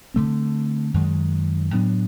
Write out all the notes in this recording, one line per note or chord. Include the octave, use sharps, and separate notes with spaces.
D3 F3 A3 C4
F#2 D#3 G#3
A2 F#3 B3 D4